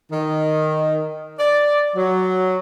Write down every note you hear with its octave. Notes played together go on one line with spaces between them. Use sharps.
D#3
D5
F#3